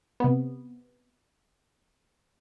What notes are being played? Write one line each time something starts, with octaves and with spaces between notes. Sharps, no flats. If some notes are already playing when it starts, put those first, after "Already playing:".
C3 B3